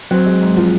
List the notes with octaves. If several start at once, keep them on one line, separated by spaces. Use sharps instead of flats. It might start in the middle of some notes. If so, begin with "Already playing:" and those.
F#3 C4
G#3
G#2
F3